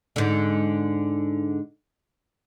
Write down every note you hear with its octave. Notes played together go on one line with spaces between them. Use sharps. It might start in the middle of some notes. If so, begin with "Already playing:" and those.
G#2 D3